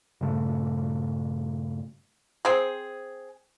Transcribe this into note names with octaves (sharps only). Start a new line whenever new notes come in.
G2 A#2 C#3 A3
C4 G#4